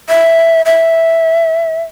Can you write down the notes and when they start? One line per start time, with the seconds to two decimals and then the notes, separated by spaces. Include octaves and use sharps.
0.09 E5
0.66 E5